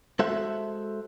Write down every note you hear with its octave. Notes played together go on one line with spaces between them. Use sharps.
G#3 F#4 A4 C5 E5 F#5